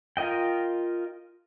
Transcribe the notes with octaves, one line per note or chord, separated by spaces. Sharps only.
F4 A#4 D#5 G5